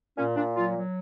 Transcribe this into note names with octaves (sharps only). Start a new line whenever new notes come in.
A#2 C#4
A#2 D4
F#3 F4
F#3